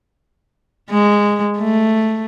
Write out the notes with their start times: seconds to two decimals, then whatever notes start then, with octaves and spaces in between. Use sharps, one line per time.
0.90 G#3
1.58 A3